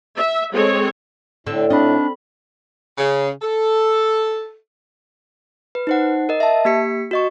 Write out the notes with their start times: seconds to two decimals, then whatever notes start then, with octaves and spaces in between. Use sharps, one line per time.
0.17 E5
0.53 G#3 C4 G#4 A4 C#5
1.47 A2 D3 C4
1.70 C4 D4 D#4 B5
2.97 C#3
3.42 A4
5.75 B4
5.87 D#4 C5 F#5
6.29 A#4 D#5
6.40 E5 A5
6.65 A#3 G4 B6 C#7
7.11 F#4 D#5 C#6